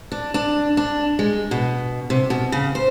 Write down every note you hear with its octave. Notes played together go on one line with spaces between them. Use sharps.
D4
D4
D4
G#3
B2
C3
B2
C#3
C5